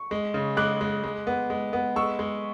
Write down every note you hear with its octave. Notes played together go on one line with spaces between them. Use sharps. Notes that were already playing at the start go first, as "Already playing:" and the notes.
Already playing: C#6
G#3
C#3
G#3 D6 F#6
G#3
G#3
B3
G#3
B3
G#3 C#6 E6
G#3